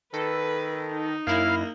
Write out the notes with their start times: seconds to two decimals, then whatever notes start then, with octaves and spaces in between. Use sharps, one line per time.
0.14 D#3 A4 B4
0.93 D#4
1.27 F#2 A#3 E4 F5